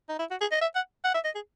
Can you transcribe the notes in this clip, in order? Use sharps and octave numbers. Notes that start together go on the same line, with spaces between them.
D#4
E4
F#4
G#4
D#5
E5
F#5
F#5
E5
D#5
G#4